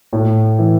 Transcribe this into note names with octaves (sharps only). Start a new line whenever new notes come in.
A2
E3